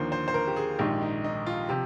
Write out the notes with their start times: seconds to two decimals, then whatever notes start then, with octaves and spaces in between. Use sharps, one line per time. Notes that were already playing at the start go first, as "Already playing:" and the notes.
Already playing: D#2 D3 F3 A#3 C5
0.12 C5
0.28 C5
0.34 A#4
0.47 G4
0.56 G#4
0.78 A#1 G#2 D#3 G4
1.02 D#4
1.24 D#4
1.47 F4
1.69 C3 F3 G4